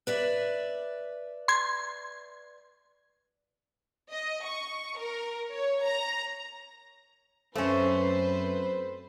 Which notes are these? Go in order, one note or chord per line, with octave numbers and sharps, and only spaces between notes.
B4 D5 E5
C6 G#6
D#5
C#6
A#4
C#5
A#5
F#2 A3 C4 C#4 B4 C5